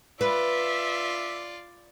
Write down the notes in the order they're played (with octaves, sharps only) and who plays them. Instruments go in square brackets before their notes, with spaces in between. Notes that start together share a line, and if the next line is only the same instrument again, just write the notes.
[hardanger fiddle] F4 D5 [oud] B4 [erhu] E5